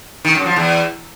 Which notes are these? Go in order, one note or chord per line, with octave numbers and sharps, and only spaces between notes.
D#3
F#2
F3
E2